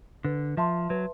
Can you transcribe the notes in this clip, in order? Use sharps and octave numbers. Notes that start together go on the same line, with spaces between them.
D3 B4
F3 E5 A5 C6
F#3 B4